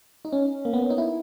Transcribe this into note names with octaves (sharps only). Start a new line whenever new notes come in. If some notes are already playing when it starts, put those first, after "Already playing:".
D#4
C#4
A#3
B3
C#4
D#4
E4